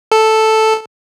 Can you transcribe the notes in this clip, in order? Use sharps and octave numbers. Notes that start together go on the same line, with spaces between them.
A4